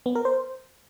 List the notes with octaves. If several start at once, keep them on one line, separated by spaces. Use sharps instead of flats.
B3
A#4
C5